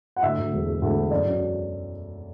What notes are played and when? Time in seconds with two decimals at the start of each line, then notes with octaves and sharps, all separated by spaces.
0.16 F#5
0.23 D2 E5
0.38 D2
0.52 E1
0.66 G#3
0.82 D2
0.96 G#3
1.11 F#2 D5
1.25 F#2